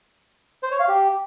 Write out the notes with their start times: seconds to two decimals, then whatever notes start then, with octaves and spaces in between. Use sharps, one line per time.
0.63 C5
0.71 C#5
0.80 F5
0.88 G4